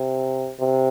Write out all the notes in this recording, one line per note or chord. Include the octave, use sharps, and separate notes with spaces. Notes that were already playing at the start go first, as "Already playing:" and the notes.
Already playing: C3
C3